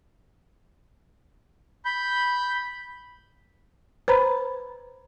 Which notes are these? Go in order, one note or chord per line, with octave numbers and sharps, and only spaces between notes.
B5 G6
B4 C5 A#5 B5